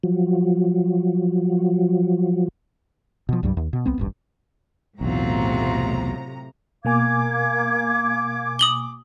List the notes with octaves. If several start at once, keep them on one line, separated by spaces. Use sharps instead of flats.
F3 F#3
B2 F3
C2 G2 F#3 G3
D#2
B2
C2 B3 C4
D#1 A1 G2
B1 E2 A2 C3 F#3 C4 F4 A#5
B2 A#3 A#4 F5 G#5 D6 G#6
D#6 F#7 G7